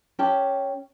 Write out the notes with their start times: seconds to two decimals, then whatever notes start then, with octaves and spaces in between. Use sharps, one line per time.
0.19 C#4 G4 C#5 A5